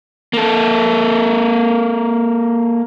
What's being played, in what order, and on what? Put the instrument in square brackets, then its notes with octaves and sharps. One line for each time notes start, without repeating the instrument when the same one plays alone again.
[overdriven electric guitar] A#3 A4